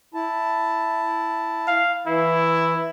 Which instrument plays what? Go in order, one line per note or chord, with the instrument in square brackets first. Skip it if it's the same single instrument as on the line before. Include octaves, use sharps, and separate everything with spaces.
[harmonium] E4 A5
[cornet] F5
[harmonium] E3 [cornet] E4